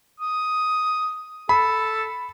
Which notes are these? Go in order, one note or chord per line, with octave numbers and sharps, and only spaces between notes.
D#6
A4 B5